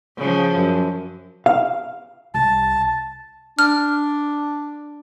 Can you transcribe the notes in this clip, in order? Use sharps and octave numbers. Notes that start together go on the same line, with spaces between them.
C#3 F3
F#2
F5
C2 A5
D4 F6